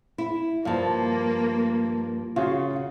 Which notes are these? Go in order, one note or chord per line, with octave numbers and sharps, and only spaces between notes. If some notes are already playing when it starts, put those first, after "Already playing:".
E4
G2 F3 A#3 F5 A5
C#3 F4 F#4